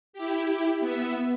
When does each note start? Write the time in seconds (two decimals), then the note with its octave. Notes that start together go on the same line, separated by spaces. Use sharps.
0.13 E4 G4
0.80 B3 E5